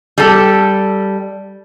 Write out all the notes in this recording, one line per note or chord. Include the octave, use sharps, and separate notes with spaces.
G3 A4